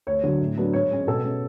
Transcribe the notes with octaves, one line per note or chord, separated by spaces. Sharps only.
D2 C#5
D3 F#3
A2
F#3 B3 D4
G#2 C#5
G#3 C#4
B2 A4
G#3 C#4